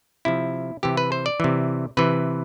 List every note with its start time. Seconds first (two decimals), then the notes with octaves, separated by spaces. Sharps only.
0.25 C3 F3 E4
0.83 C3 E3 G4
0.97 B4
1.12 C5
1.26 D5
1.40 C3 E3
1.97 C3 E3 B4